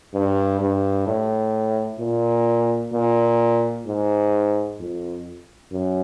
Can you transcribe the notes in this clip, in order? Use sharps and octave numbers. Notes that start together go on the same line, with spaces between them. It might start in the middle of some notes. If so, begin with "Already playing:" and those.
G2
G2
A2
A#2
A#2
G#2
F2
F#2